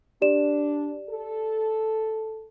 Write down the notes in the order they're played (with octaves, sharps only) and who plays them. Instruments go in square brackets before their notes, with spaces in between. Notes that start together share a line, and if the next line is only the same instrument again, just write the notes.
[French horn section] D4 [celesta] G4 D5 E7
[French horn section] A4